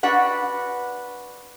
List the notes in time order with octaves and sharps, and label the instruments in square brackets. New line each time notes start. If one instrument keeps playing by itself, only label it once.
[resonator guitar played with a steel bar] D4 F#4 B4 F#5